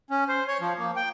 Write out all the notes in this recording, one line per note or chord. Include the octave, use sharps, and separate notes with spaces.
C#4
C5
C#5
F3
A#3
G5